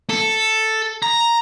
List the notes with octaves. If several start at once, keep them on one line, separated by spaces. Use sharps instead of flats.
A4
A#5